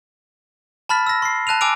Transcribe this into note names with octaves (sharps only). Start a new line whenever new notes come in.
A5 B5 F6 A6 B6
E6 A#6
C6 C7
A5 F#6 D#7 F7
G#5 A5 D6 E6 D7 F7